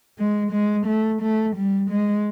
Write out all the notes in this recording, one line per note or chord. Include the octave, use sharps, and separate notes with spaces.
G#3
G#3
A3
A3
G3
G#3